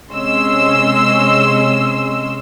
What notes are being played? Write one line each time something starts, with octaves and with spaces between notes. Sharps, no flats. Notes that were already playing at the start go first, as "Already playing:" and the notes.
C3 G#3 C#4 D#5 C6 E6